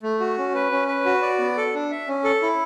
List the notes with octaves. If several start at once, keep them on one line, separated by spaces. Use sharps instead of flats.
A3
F#4
C#4
B4
C#4
B4
F#4
D5
B3
A4
D4
E5
C#4
A4
E4